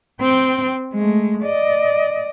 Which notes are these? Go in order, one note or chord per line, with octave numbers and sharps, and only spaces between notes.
C4 G5
G#3 A3
D5 D#5